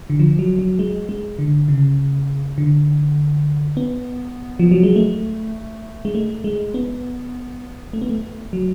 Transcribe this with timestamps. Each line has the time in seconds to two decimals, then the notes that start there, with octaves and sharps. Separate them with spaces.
0.10 D3
0.19 F3
0.39 F#3
0.59 F#3
0.79 G#3
1.09 G#3
1.39 D3
1.68 C#3
2.58 D3
3.77 B3
4.59 F3
4.71 F#3
4.83 G#3
4.96 A3
6.05 G#3
6.15 A3
6.44 G#3
6.74 B3
7.93 A3
8.01 B3
8.09 A3
8.53 F#3